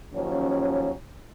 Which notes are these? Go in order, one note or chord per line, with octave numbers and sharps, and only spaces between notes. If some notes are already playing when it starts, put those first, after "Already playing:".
D#2 F3 F#3 C#4